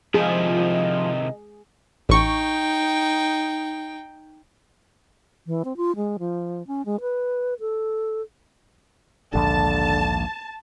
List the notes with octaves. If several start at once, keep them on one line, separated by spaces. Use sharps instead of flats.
C3 D#3 F3 E4 G#4 D#5
A1 D#4 G5 C#6
E3
C4
F4
G#3
F3
C#4
G#3
B4
A4
A#1 D#2 G#2 D3 A5